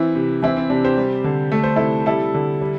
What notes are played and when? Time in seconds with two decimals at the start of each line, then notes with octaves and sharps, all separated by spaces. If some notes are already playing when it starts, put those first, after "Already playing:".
Already playing: E3 C4 E4
0.15 C3
0.42 E3 C4 E4
0.57 C4
0.70 C3 D4
0.84 G4 C5
0.98 G3
1.24 D3
1.52 A3 A4
1.63 C5
1.76 C3 E4 A4
2.06 G3 E4 A4
2.34 D3
2.61 G3